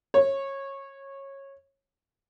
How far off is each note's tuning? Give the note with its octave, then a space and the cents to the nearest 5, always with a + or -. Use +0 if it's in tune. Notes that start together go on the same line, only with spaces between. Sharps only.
C#5 -20